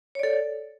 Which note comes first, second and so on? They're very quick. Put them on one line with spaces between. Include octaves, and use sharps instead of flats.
C#5 D5 A4